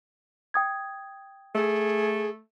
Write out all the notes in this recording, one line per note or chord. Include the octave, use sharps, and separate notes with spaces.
G5 D#6 G#6
A3 G#4